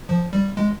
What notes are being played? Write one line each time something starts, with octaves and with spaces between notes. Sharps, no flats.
F3
G3
G#3